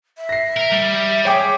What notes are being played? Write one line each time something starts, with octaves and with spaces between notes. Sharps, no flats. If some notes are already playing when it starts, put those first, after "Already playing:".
E5
A#6 C7
A#4
G3
G#4 C#5 G5 D6